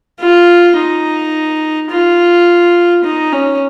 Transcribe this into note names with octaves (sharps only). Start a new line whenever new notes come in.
F4
D#4
F4
D#4
C#4